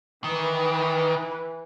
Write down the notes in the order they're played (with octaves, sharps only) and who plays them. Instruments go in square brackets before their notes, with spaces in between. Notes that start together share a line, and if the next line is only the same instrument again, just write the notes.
[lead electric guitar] D#3 [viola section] E3 B4